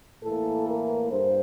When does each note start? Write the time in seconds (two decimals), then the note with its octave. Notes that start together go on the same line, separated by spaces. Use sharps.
0.23 A2 E3 A#3 A4
0.67 A#4
1.11 G2 C5